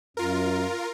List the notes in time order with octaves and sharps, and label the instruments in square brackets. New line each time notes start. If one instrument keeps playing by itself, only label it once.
[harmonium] F#2 [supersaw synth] F4 A#4